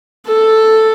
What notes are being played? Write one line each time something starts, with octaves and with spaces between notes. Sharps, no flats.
A4